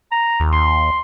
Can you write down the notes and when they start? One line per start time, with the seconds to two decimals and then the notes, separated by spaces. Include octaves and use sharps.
0.11 A#5
0.40 D#2
0.52 D#2 C6